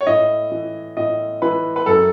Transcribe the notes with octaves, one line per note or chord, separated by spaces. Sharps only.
C#5
A2 D#5
E3
A2 D#5
E3 B4
B4
F#2 A4